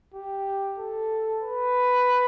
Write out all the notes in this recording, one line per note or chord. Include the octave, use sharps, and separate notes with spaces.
G4
A4
B4